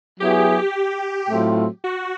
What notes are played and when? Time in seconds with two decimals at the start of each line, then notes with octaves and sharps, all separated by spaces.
0.20 F#3 B3 E4 G4 G#4
1.29 A2 F#3 A3 C4 F4
1.84 F#4